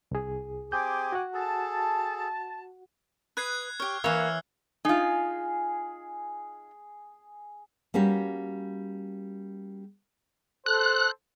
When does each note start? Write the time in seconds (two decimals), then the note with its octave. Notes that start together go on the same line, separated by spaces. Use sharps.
0.11 C2 G#4
0.72 C4 G4 G#4 G5 G#5 D6 G6
1.12 F#4 F#5
1.34 G#4 A4 A5
3.37 B4 D#6 F#6 G#6 C7
3.80 G4 C#5 F6
4.04 E3 A#3 C#5 E5 F5 E6
4.85 D#4 F4 G#4
7.94 G3 A#3 C#4 F#4 G4
10.66 A4 C5 F#6